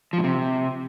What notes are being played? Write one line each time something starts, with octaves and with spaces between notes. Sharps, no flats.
F3
A2
C3